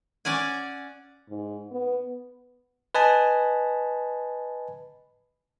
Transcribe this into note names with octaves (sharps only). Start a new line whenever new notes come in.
C#4 D5 F#5 G#5
G#2
B3
B4 D#5 G#5 A5 B5